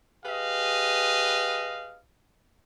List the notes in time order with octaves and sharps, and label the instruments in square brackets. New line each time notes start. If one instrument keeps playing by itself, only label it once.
[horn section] G4 G#4 B4 D#5 F5